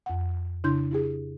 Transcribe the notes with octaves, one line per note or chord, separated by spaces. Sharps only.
F2 F#5
C#3 D4 E4 C6 G6
E4 G4 G#4